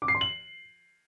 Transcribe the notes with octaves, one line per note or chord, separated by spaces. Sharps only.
D6
C7
C6
F#7